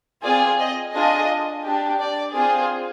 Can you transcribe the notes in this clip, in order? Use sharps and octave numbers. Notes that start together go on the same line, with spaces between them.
C4 F4 G#4 D5
D#5
D4 F4 G#4 D#5
D4 G4
D5
C4 F4 G#4